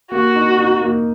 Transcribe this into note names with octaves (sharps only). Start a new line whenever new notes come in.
A#3 F#4
D#4
D#4
A#3